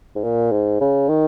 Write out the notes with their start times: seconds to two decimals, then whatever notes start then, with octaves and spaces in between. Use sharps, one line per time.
0.16 G#2
0.24 A#2
0.52 G#2
0.81 C#3
1.09 D#3